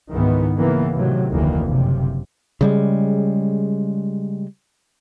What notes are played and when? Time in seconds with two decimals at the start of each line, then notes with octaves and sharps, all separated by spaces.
0.12 C#2 G#2 D#3 E3 B3
0.58 C#3 E3 A#3 B3
0.95 A2 C3 D#3 F#3
1.32 F1 D2 D#3 E3 A#3
1.68 F#1 C3 F3
2.61 C#3 G3 G#3